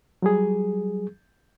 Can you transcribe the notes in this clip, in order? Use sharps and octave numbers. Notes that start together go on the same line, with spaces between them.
F#3 G3 G#4